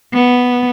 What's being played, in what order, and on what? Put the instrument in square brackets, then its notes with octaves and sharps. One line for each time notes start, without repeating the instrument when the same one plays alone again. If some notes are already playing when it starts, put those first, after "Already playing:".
[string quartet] B3